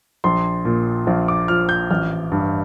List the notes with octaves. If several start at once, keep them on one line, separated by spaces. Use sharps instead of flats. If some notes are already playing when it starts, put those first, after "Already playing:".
A#1 C6
A#2
A#1 F5
D6
F3 F6
G6
A1 F6
G2